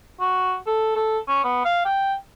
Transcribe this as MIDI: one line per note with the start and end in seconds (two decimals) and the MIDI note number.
0.20 0.56 66
0.67 0.94 69
0.95 1.18 69
1.28 1.42 61
1.44 1.60 59
1.65 1.84 77
1.85 2.14 79